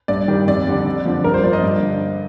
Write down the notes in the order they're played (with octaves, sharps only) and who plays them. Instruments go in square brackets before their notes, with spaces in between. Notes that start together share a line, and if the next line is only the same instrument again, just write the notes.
[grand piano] G2 D5
D#3 G3
F2 D5
D3 G3
F2
D3 F3
G2 A#4
C5
F3 D5
D#5
G2
D3